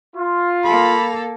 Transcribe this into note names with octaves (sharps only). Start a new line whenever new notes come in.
F4
A#3 A4 B5